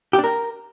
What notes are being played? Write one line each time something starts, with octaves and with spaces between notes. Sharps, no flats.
G4
D4
A#4